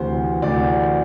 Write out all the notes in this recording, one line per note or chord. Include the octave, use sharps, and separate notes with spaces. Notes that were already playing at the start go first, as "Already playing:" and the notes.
Already playing: D2 C3 E3 C5
D2 C3 E3 D5